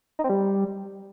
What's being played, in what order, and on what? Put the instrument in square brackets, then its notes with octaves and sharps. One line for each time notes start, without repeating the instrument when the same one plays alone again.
[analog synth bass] D#4
C4
G3